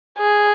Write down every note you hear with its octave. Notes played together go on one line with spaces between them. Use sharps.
G#4